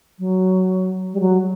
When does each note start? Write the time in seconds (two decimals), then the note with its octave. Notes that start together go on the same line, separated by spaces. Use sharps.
0.19 F#3
1.13 G3
1.20 F#3